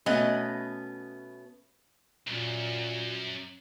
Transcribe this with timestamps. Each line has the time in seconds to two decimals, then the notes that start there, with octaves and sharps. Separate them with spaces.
0.06 B2 A3 B3 C#4 D#5 F#5
2.27 B1 F#2 A#2